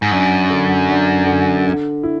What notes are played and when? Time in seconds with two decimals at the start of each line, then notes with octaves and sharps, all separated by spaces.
0.02 G#2
0.11 F#2 D4
0.50 D3
0.89 D4
1.27 D3
1.65 D3
2.03 E4